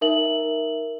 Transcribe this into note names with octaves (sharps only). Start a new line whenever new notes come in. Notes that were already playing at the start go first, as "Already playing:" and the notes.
D#4 A#4 E5 F#7